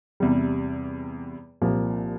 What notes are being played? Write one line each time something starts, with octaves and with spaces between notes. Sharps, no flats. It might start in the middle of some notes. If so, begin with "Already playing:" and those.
E2 C3 G3
C2 A#2 F3